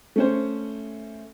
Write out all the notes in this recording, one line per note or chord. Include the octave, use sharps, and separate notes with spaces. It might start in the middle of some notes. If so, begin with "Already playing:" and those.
A3 C#4 C5